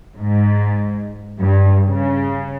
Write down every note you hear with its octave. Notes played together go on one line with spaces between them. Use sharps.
G#2
G2
C#3